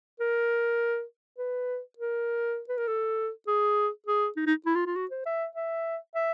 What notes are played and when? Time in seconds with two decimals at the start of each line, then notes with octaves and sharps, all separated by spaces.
0.20 A#4
1.38 B4
1.98 A#4
2.69 B4
2.77 A#4
2.88 A4
3.48 G#4
4.07 G#4
4.37 D#4
4.47 D#4
4.66 E4
4.76 F4
4.86 F4
4.96 F#4
5.11 C5
5.26 E5
5.55 E5
6.15 E5